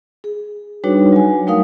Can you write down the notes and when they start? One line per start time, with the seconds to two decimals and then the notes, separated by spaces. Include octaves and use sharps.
0.24 G#4
0.84 G3 D4 D#4 F#4 B4 C#5
1.12 F#3 G#5
1.47 G3 A3 D#4 A#4 F5 D#6